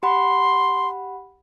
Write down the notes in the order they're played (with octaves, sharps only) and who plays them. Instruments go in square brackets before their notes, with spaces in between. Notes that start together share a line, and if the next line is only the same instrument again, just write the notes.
[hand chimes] G4 F#5 B5 [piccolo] C6